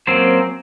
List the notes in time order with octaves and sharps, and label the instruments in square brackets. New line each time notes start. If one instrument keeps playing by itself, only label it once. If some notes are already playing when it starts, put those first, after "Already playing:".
[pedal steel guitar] F#3 A#3 C4 C#4 C5